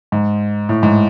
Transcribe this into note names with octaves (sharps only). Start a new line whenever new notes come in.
G#2
A2
G#2